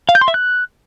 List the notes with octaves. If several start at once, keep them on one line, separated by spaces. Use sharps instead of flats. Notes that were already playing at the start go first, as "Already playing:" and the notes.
F5
G6
C6
E5
F#6